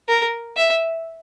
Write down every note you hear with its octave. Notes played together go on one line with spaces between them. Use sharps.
A#4
E5